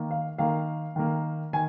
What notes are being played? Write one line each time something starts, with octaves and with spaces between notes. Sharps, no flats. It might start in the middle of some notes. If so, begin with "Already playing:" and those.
Already playing: D#3 A#3
F5
D#3 A#3 F5
D#3 A#3
D#3 G#5